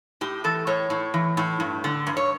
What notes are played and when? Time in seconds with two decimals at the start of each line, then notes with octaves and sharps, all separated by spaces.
0.21 A2 G4
0.44 E3 A4
0.67 A2 C#5
0.90 A2
1.14 E3
1.37 A2
1.60 G2
1.84 D3
2.07 G2
2.17 C#5